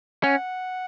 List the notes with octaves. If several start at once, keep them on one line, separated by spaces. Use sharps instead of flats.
C#4 F#5